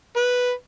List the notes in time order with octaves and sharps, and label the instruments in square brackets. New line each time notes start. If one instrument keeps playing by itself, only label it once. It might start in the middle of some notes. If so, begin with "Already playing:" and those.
[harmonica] B4